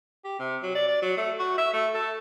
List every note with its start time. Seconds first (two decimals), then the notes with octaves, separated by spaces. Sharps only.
0.24 G4
0.39 C3
0.62 F#3
0.75 D5
0.88 D5
1.02 F#3
1.17 A3
1.39 F#4
1.58 E5
1.73 A3
1.94 A4